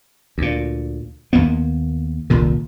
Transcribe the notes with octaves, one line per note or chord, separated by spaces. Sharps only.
D2 A#2
D#2 A#3 B3
D#1 C2 A#2 D#3